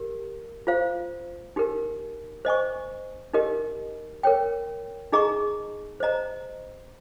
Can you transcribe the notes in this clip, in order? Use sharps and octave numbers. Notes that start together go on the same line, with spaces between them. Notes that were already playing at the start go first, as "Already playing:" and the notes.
Already playing: G4 A#4
F4 C5 F5
D#4 G4 A#4
C5 D#5 G#5 C#6
D#4 G4 A#4 D#5
A#4 C#5 G5
D#4 G#4 D#5 A#5 C#6
C5 D#5 A#5